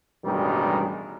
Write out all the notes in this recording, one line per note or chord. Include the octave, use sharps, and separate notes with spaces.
A1 G2 B2 D#3 G3 G#3